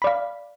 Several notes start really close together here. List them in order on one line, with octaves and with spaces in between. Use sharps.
B5 D5 F5